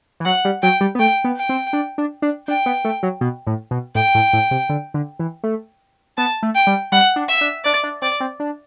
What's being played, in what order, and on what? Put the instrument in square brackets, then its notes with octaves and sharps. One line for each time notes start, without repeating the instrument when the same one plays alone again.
[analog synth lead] E3
[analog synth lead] F#3 [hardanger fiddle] F#5
[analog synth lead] G3
[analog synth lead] F#3 [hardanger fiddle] G5
[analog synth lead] G3
B3
[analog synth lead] A3 [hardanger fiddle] G5
[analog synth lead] B3
[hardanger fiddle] G5
[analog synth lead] C4
D4
D4
D4
[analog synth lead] D4 [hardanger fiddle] G5
[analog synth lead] B3
A3
F#3
B2
A2
B2
[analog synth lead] A2 [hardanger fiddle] G5
[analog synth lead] A2
A2
C3
D3
D3
E3
A3
[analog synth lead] B3 [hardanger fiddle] A5
[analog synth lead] A3
[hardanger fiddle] G5
[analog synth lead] G3
[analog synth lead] G3 [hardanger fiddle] F#5
[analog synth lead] D4
[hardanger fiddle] E5
[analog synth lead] D4
[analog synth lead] D4 [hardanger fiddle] D5
[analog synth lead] D4
[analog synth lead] C4 [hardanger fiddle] D5
[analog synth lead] C4
D4